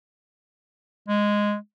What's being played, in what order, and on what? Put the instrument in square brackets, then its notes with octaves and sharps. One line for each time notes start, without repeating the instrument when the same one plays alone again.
[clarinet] G#3